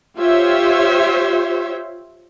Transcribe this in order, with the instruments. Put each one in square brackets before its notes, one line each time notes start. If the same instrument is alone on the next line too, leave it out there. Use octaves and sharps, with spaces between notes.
[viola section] F4 G4 C5 C#5 E5